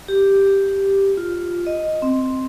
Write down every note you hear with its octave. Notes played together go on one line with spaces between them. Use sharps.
G4
F4
D#5
C4